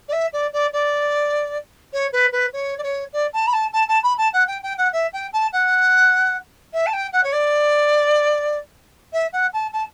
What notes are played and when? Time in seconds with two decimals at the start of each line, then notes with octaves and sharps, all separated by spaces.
0.08 D5
0.12 E5
0.33 D5
0.53 D5
0.73 D5
1.93 C#5
2.12 B4
2.32 B4
2.53 C#5
2.78 D5
2.83 C#5
3.13 D5
3.33 A5
3.47 B5
3.53 A5
3.73 A5
3.88 A5
4.03 B5
4.18 A5
4.33 F#5
4.47 G5
4.63 G5
4.77 F#5
4.92 E5
5.13 G5
5.33 A5
5.52 F#5
6.73 E5
6.86 A5
6.93 G5
7.12 F#5
7.23 C#5
7.32 D5
9.13 E5
9.32 F#5
9.53 A5
9.72 A5